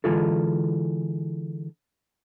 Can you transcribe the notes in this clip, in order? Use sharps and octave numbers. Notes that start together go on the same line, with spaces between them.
D3 E3 G#3 F4 A4